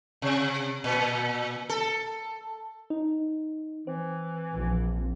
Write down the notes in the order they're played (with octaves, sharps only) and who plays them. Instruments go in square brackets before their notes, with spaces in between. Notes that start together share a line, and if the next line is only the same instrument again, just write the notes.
[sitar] C3
A#2
A4
[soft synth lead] D#4
[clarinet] E3 [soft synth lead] C4
[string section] A#1